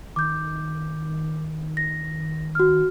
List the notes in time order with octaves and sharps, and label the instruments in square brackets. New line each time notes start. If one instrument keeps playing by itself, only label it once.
[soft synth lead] D#3 [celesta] D6 G6
[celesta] A#6
F#4 F6